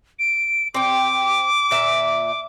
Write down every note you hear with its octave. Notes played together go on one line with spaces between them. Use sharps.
D7
C4 G5 D6
A#2 E5